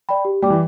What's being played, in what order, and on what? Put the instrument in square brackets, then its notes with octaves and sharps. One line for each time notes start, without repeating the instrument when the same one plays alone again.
[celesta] D5 G5 B5
G4
[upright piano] G3 [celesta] D5 G5 D6
[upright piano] E3